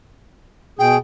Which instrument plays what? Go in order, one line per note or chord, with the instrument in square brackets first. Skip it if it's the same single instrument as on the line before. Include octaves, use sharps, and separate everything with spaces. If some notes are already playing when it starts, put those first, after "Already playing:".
[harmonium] B2 G#4 [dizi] G5